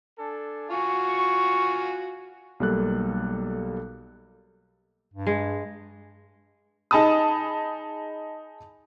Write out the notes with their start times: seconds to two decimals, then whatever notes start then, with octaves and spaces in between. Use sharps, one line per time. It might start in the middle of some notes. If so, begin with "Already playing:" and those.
0.18 D4 A4 G#5
0.71 F4 F#4 G#5 C#6
2.60 B1 G3 A#3 A4 F#6
5.14 G2
5.27 G#3
6.91 D#4 G#4 A5 B5 D#6